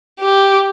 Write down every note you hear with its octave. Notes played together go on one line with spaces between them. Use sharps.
G4